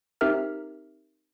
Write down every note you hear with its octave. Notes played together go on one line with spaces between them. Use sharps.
C4 D#4 G4 A#4 E5 F6